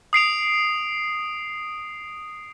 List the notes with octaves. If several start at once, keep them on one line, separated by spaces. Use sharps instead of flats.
D#6 C7 D7 F7